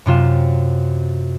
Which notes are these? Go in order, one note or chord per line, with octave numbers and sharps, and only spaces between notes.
F#2 C3 F4 E7